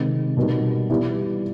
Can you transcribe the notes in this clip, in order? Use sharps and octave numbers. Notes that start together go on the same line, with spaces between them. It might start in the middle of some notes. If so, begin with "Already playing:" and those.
Already playing: C3 D#3 G#3 C4
B2 G3 A#3 D#4 G4
E3 G3 B3 E4 G4